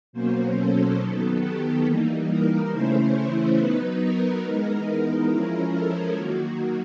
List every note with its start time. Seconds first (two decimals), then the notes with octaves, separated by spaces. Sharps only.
0.13 B2 F#3 A#3 C#4 C5
0.55 A4
0.98 D#3 F#3 B3
1.41 G4
1.85 E3 G3 A#3 D#4
2.28 A#4
2.71 C#3 E3 A3 C#4 E4 C5
3.57 F#3 B3 D#4 B4
4.01 A#4
4.43 E3 G#3 B3 D#4
5.29 F3 G#3 C#4 E4
5.72 A4
6.15 D#3 F#3 A#3 F#4